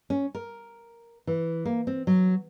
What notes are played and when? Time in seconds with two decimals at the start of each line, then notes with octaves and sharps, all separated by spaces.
0.10 C#4
0.35 A#4
1.27 E3
1.65 A#3
1.87 C4
2.07 F#3